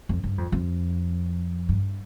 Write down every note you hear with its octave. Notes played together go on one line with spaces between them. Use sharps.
F2
G2
F2
F2
G2